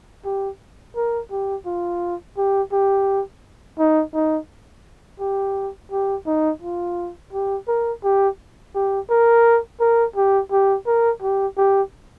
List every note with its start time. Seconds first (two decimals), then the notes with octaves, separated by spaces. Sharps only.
0.25 G4
0.96 A#4
1.31 G4
1.66 F4
2.37 G4
2.72 G4
3.79 D#4
4.14 D#4
5.20 G4
5.91 G4
6.27 D#4
6.62 F4
7.33 G4
7.68 A#4
8.04 G4
8.75 G4
9.10 A#4
9.80 A#4
10.16 G4
10.52 G4
10.87 A#4
11.22 G4
11.57 G4